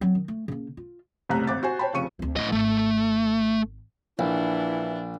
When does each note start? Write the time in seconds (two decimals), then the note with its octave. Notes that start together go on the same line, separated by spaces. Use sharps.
0.01 F#3 C4
0.15 D#3
0.28 A3
0.48 C#3 A#3
0.77 F4
1.29 F#1 C2 A2 A3 A#5 F#6
1.47 G#1 D6 A6
1.63 F#4 C5 G#5
1.79 C5 C#5 G5 A5 B5
1.93 F1 C#3 F3 C#6 C#7 D#7
2.19 D2 C4
2.36 A2 C#4 D#5
2.52 G#1 A3
4.19 A#1 E3 D4 E4